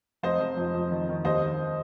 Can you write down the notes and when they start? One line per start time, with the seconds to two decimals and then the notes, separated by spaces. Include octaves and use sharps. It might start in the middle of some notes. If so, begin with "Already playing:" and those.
0.23 F1 C5 D#5
0.40 F1
0.57 F2
0.75 F2
0.91 D#3
1.09 D#3
1.25 D#2 C5 D#5
1.42 D#3